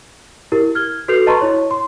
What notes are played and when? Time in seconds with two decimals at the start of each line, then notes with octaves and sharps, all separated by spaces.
0.52 E4 G4 A#4
0.75 F6 G#6 G7
1.08 F#4 A4 B4 G6 C7 F7
1.26 B4 D#5 A5 A#5 C6 C#6
1.41 E4 C#5
1.71 C6